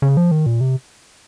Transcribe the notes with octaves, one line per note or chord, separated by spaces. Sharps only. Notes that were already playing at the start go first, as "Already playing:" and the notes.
C#3
F3
D#3
A#2
C3